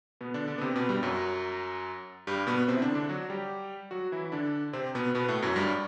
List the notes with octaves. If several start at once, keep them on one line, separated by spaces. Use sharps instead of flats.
B2 B3
D3 D4
D3 D4
B3
C3 C4
B2 B3
G2 G3
F#2 F#3
G2 G3
B2 B3
C3 C4
E4
D3 D4
D3 D4
F#3 F#4
G3 G4
F#3 F#4
E3 E4
E4
D3 D4
C3 C4
B2 B3
B2 B3
A2 A3
F#2 F#3
G2 G3